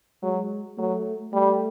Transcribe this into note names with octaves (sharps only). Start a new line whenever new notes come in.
F#3 G#3
F#3 A3
G3 A3